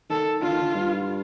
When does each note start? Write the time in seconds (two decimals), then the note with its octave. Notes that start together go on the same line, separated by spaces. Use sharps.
0.10 D#3 A4
0.42 D3 F4
0.53 D#3
0.62 D3
0.75 G2